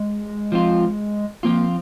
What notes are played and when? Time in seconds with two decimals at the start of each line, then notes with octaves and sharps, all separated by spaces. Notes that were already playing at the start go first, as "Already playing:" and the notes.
Already playing: G#3
0.52 F3 C4 F4
1.43 F3 A#3 C4 F4